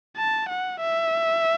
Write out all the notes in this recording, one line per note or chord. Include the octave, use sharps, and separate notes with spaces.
A5
F#5
E5